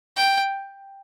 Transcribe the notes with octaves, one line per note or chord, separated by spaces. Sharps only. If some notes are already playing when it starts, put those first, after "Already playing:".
G5